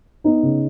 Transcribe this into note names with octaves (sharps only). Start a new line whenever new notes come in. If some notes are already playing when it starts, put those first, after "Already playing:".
B3 D#4
C#3